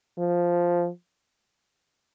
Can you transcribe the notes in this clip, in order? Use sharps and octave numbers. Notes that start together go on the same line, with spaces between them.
F3